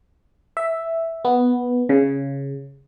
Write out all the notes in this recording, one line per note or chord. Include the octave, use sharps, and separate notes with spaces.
E5
B3
C#3